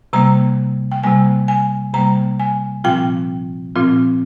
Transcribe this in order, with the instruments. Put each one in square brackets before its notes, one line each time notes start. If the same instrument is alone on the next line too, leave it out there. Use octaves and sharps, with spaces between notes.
[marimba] C3 G3 A#3 A#5
G5
C3 G3 A#3 G#5
G#5
C3 G3 A#3 A#5
G#5
A#2 F3 C4 F4 G5
A#2 F3 C4 F4